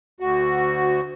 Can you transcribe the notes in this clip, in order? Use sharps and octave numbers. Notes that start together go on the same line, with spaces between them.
D2 F#4